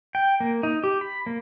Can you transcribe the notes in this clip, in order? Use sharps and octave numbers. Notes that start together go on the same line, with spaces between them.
G5
A#3
D#4
G4
B5
A#3